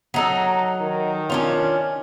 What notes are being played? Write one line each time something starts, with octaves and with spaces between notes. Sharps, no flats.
F#3 D#4 A4
D#3
C#4 D4 F4